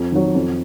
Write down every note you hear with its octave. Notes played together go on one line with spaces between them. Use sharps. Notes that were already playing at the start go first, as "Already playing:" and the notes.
Already playing: F2
D#3 F#3
F2